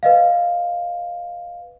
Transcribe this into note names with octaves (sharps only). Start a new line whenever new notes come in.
B4 D#5 F5